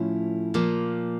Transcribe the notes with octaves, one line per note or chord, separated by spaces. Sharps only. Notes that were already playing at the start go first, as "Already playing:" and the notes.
Already playing: A2 F3 A3 C#4 E4
A#2 F3 A#3